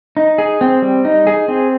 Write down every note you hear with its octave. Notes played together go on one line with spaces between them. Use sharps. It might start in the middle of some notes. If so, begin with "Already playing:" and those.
D#4
G#4
C4
G3
D#4
G#4
C4